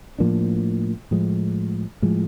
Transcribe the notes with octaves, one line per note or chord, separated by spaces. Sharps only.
A2 F3 A#3 D4
A2 F3 G#3
A2 F3 G#3